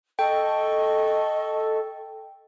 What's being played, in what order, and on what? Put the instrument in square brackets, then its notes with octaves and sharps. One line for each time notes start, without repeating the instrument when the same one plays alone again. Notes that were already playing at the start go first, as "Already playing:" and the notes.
[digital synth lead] A4 [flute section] D#5 C#6 [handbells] G5